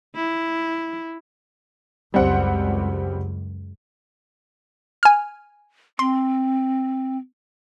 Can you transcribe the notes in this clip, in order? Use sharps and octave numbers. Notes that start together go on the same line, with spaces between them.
E4
C#2 F#2 G3 C4 F#5
G#5 F6
C4 C6